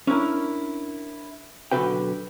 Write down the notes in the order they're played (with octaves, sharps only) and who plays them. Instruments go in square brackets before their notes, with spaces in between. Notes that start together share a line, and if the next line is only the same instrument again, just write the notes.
[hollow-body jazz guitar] C#4 D4 E4 A#4
B1 F#2 D3 F#4 B4 G5